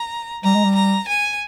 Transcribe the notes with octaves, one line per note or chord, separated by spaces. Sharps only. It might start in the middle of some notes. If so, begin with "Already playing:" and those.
Already playing: A#5
G3 A#5
G#3
G3
A#5
G#5